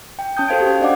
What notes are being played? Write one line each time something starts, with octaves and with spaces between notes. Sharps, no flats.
G5
C#4 A5 D#6 G6
F#4 A4 C5 F5 G#6 D7
G4 F5
D4 D5 D#5 F5 F#5 D6